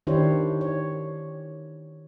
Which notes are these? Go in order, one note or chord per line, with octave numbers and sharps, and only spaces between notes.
D#3 D4 E4 G4 C5 C#5
C#5